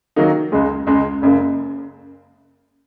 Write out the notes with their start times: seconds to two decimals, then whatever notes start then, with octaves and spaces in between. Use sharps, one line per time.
0.16 D#3 F#3 A#3 D#4
0.52 C#2 C#3 G#3
0.87 C#2 C#3 G#3
1.22 F#1 F#2 C#3 A#3